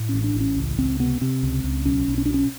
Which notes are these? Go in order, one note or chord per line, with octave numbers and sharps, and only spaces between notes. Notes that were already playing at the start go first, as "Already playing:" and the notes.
Already playing: A2
A1 C#4
D4
A1
C#4
C#2
C#2 C4
C3 B3
C3 C4
C#2
C#2
B1 C#4
B1
C#4
D4
B2 C#4